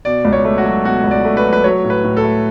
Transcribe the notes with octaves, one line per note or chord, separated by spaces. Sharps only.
B2 D5
C#2
C#5
A3
F#4
F#3
B2 F#4
C#2
D5
A3
B4
F#3
B4
F#3 C#5
A2
B4
A2
A4
A3